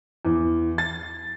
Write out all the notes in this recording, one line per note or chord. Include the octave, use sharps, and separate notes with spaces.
E2
A6